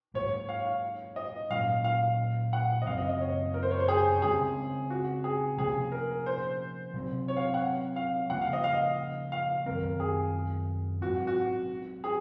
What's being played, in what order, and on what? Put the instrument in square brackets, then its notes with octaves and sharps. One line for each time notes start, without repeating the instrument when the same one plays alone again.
[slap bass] G#2 F#3 A#3 [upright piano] C#5
[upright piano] F5
F5
D#5
[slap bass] A#2 F#3 C#4 [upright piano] F5
[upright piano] F5
F#5
D#5
[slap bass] F#2 C#3 F#3 C4 [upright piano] F5
[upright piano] D#5
D#5
C#5
A#4
C5
C#5
C5
G#4
[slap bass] C#3 G#3 C4 [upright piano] G#4
[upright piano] F#4
G#4
[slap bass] C3 F3 A#3 C#4 [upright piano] G#4
[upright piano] A#4
C5
[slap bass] C3 F#3 C4
[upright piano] C#5
F5
F#5
F5
[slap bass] C#3 F3 A#3 [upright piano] F#5
[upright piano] F5
D#5
F5
F5
[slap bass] F#2 D#3 F#3 C4 [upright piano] A#4
[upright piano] G#4
[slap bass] G#2 F#3 C4 [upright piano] F#4
[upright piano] F#4
G#4